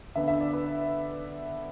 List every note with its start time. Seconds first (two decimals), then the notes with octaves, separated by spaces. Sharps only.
0.16 D3 B3 D4 E5
0.28 E5
0.41 D5
0.53 B4